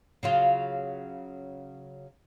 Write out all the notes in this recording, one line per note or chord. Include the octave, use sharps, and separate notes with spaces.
C#3 F#3 F4